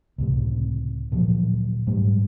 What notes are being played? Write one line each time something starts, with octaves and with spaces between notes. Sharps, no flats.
C#2 A2 C3
D2 A#2 F3 F#3
G#2 F#3 G3 A3